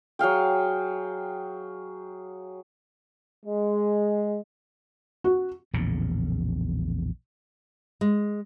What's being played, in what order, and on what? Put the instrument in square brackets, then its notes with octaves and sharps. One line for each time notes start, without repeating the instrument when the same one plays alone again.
[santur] F#3 G#4 F5 G5
[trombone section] G#3
[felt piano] F#4
[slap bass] A#1 E2 A2 C#3
[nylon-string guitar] G#3